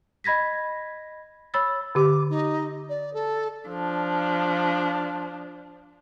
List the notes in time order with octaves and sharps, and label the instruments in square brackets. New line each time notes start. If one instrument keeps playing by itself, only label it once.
[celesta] D#5 B5 G#6 A#6 B6
C#5 B5 E6 A6
[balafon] D3 G4 [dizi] D6
[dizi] D#4
D5
A4
[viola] F3 D4